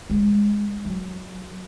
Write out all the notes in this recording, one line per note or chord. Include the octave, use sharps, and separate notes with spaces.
G#3
F#3